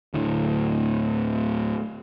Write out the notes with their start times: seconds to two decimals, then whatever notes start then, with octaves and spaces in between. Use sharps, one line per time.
0.14 D1 D2 A2